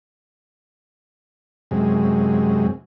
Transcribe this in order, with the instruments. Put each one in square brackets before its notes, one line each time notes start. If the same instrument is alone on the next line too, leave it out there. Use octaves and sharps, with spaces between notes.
[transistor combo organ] F#2 C3 G#3